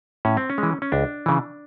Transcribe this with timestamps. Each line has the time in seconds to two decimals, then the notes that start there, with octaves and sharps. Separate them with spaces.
0.25 A2 C#4
0.37 C4
0.50 C#4
0.58 E3 G#3
0.82 C#4
0.92 C#2 D4
1.26 C#3 E3